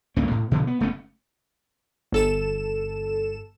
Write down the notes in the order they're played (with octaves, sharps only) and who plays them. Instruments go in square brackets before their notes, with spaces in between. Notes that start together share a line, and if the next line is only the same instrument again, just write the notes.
[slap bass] C#2 G2 A#3 C#4
A2
B2 D3 F3 B3
B3
F#1 A3 B3 C#4
[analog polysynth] G1 A4 E7